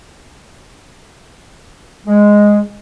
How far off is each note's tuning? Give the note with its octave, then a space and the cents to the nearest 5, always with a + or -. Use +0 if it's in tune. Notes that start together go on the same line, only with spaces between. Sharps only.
G#3 -5